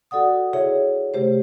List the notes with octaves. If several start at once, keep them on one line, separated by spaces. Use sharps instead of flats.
F#4 A4 D5 F#5 D#6
E4 G#4 C#5 E5
C3 A3 G4 C5